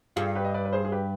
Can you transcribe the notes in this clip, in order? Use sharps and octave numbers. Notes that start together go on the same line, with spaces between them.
G2 F4 G#4
G4 B4
D#5
B4 D5
B4
G#4 C5
G#4
G4 B4